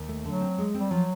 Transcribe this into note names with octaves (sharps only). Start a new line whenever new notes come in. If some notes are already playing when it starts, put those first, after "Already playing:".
Already playing: D#2
A3
D3 F#3
C4
G#3
C4
G3
F3 F#3